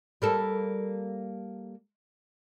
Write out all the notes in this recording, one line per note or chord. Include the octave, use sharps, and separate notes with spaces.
G3 A#3 A4